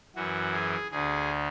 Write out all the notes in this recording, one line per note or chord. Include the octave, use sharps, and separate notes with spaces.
F#2 E3 F#4
G#4
D2 D3 G#4